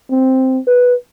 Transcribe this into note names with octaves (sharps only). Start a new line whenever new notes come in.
C4
B4